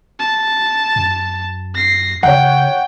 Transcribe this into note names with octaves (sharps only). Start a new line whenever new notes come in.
A5
F#2
A#6 C7
C#3 C#5 F#5 G5